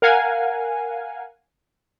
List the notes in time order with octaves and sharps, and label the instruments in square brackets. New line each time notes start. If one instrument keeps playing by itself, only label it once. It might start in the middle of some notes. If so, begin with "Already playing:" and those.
[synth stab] A#4 F5 F#5 G#5